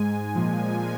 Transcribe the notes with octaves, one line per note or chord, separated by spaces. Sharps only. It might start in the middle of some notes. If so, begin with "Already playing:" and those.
Already playing: G#2 G#3 G#5
A#2 F3 G#3